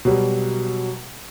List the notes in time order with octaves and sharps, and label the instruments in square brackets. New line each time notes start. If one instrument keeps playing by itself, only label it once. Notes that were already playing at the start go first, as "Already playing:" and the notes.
[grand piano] B2 F#3 G3